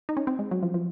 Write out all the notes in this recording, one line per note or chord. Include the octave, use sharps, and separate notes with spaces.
D#4
C#4
C4
G#3
F#3
F3
F3